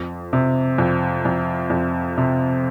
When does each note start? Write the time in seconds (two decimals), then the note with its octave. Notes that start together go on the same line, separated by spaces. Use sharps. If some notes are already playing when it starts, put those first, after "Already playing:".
Already playing: F2
0.33 C3
0.78 F2
1.25 F2
1.70 F2
2.18 C3